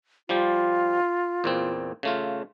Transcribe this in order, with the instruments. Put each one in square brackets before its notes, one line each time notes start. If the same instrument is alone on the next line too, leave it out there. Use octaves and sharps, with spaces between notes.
[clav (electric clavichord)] F3 G3 G4 [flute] F4
[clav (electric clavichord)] E2 A#2 C4
C#3 A3 F4